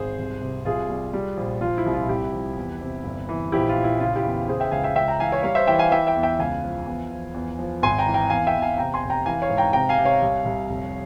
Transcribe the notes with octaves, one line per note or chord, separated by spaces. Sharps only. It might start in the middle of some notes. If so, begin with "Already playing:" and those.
Already playing: G#1 G#4 C5
C2
C3
C2 F4 G#4
G3
G3
A#1
F3 F4
E4
C2
F4
C2 E4 G4
F3
E2
C3
G1
E3
A#1 E4 G4
F4
A#2
E4
C#3 F4
E4 G4
E2
C#3 G#4 C5
E5 G5
C#2 F5 G#5
E5 G5
C#2 E5 G5
G5 A#5
E3 F5 G#5
C#5 F5
G3 C#5 F5
C5 E5
E3 E5 G5
F5 G#5
E3 E5 G5
E5 G5
E2
E5 G5
C#2 F5 G#5
F3
E2
F3
E2
F3
G#1 G#5 C6
G5 A#5
E3
G5 A#5
E2 F5 G#5
E5 G5
E2
F5 G#5
C3 G5 A#5
G#5 C6
F1
G5 A#5
E3 F5 G#5
C#5 F5
G#2
G5 A#5
C3 G5 A#5
F5 G#5
C3
C#5 F5
C2
C2
F1